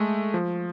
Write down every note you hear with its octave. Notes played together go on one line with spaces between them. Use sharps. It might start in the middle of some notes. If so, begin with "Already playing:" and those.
Already playing: G#3 A3
F3